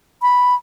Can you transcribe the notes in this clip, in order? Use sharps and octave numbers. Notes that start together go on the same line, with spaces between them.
B5